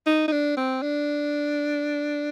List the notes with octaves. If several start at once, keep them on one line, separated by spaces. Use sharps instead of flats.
D#4
D#4
D4
C4
D4